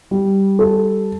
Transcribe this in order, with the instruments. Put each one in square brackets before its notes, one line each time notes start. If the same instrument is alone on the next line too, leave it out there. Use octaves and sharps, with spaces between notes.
[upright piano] G3
A4